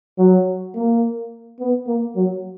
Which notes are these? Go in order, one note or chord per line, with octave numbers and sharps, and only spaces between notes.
F#3
A#3
B3
A#3
F#3